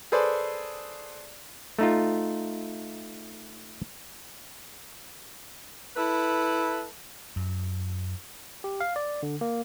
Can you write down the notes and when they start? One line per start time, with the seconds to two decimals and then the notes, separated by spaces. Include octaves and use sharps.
0.12 G#4 A4 B4 C5 D5
1.79 A3 D#4 F4
5.97 E4 A4 B4
7.36 F#2
8.64 G4
8.81 F5
8.96 D5
9.23 D3
9.41 A#3